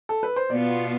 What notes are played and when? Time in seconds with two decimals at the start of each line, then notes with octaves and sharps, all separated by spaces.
0.09 A4
0.23 B4
0.36 C5
0.50 B2 B3 F4 D5